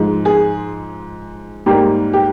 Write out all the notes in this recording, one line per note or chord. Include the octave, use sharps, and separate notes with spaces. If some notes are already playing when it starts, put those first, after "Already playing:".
Already playing: G#2 F3 G#3
G#4
G#2 G3 A#3 G4
G4